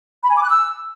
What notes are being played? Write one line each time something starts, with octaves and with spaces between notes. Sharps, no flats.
B5
G#5
D6
F#6
E6